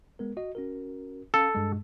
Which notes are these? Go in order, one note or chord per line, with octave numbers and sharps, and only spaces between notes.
G#3 B3 A#4
F#4 D#5
C#4 F#4 A#4
C#4 A4 F5
G2 G#3